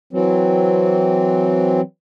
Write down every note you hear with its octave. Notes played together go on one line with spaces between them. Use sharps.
E3 F#3 C4